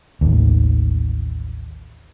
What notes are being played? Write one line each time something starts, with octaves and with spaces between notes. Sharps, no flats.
A1 D#2